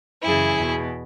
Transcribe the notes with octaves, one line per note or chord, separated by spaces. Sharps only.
F#2 C#3 E3 E4 G#4
E2 B2